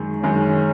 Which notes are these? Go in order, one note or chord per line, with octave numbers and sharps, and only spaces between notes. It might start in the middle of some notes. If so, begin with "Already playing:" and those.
Already playing: F#2 D#3 G#3
F#2 D#3 G#3 C#4